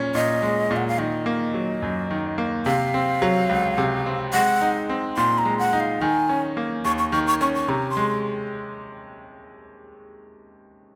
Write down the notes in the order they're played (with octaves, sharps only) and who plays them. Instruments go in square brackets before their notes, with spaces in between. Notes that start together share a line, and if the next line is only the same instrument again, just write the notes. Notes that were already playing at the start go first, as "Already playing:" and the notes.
Already playing: [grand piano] A#2 C#4
[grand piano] A#2 [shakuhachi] D#5
[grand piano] G#3
A#2
[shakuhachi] F#5
F5
[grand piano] D#3 [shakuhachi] D#5
[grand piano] A#3
F#3
F#2
D#3
A#3
[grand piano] C3 [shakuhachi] F5
[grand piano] C4
F#3
C#2
C3
C4
[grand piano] G#3 [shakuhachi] F#5
[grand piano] D#4
C4
[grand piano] A#2 [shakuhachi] C6
[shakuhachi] A#5
[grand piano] G#3
[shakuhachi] F#5
[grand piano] D#4
[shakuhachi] F5
[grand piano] D#3 [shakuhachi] G#5
[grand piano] C#4
A#3
[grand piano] D#2 [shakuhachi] C#6
[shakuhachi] C#6
[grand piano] D#3 [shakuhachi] C#6
[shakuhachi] C#6
[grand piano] C#4 [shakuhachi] C#6
[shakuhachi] C#6
[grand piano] C3 [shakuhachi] A#5
[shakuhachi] C6
[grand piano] G#3